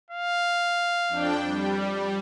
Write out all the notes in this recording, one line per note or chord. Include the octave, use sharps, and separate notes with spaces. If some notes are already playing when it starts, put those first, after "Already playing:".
F5
F2 D4 G5
G3